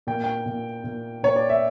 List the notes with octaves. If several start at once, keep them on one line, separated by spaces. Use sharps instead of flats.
A#2 G5
G5
A#2
A#2
A#2 C#5
D5
E5